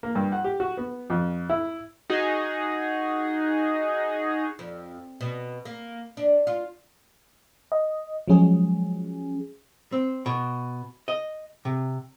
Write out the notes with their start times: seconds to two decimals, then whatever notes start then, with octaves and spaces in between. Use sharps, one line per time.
0.03 A#3
0.15 G2
0.32 F#5
0.44 G4
0.60 F#4
0.77 B3
1.10 F2
1.49 E4
2.10 D#4 F#4 G#4 D#5
4.59 F2
5.21 B2
5.65 A#3
6.17 D4
6.47 F4
7.72 D#5
8.28 F3 F#3 G#3 C#4 G#4
9.92 C4
10.26 B2
11.08 D#5
11.65 C3